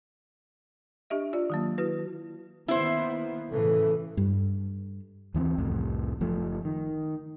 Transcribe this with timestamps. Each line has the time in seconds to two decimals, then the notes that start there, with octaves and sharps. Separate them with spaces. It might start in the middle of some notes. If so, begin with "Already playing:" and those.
1.10 D4 G4 D#5 E5
1.33 F4 D5
1.50 D#3 F#3 A#3
1.78 E4 F#4 B4
2.68 D#3 A#3 B3 E4 C5
3.52 A2 C#3 E3 A4
4.17 G2
5.34 D#2 E3 B3 C4
5.58 C2 F2 A2
6.21 F#1 F3 A3
6.65 D#3